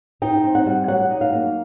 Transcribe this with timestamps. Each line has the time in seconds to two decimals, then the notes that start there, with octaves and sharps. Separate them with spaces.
0.22 D#4 G5
0.44 C4
0.55 F#5
0.66 G3
0.88 F#3 F#5
1.10 D#4
1.21 F5
1.32 A#3